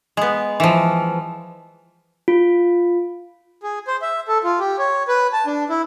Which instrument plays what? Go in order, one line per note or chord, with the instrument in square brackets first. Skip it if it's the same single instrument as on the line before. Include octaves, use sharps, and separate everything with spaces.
[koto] G#3 B3
E3 F3
[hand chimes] F4
[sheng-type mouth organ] G#4
C5
E5
A4
F4
G4
C#5
B4
A5
D4
E4